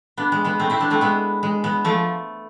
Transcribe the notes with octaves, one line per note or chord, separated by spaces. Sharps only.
B3 D4
G#3
G#3 B3
A3 C4
C4 E4
B3 D4
A3 C4
G#3 B3
G#3
G#3 B3
F3 A3